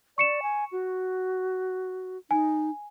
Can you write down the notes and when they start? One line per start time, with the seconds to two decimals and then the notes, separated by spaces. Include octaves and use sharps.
0.18 D5 C#6 C#7 E7
0.42 G#5
0.72 F#4
2.31 D#4 G#5